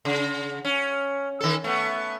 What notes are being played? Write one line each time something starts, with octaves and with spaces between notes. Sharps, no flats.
C#3
C#4
D#3 A4
A3 B3